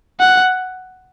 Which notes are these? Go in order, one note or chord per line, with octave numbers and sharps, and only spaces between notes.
F#5